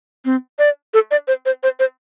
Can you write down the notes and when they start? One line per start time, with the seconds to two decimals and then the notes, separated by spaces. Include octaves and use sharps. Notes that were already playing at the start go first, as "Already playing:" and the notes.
0.25 C4
0.59 D5
0.94 A4
1.11 D5
1.28 C5
1.46 C5
1.63 C5
1.79 C5